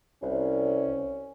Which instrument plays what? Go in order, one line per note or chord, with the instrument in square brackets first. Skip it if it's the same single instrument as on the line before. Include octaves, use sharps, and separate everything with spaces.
[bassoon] C2 [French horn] C#4